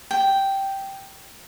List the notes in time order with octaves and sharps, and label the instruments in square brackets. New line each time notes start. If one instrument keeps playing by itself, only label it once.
[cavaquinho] G5